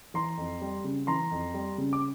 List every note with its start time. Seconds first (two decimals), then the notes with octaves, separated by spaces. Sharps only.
0.14 E3 A#5 C6
0.37 F2
0.61 G3
0.84 C#3
1.07 E3 A#5 C6
1.31 F2
1.54 G3
1.78 C#3
1.93 D6